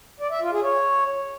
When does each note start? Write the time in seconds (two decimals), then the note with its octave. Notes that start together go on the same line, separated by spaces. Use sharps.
0.20 D5
0.31 E5
0.41 F4
0.52 G#4
0.62 C#5